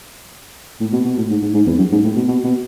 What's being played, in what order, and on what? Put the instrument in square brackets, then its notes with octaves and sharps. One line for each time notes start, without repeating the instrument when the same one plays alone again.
[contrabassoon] A2
B2
B2
A2
G#2
G#2
G#2
E2
F#2
G#2
A2
B2
B2
B2